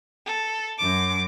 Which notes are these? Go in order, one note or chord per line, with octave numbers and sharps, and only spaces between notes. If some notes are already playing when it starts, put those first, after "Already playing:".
A4
F#2 D6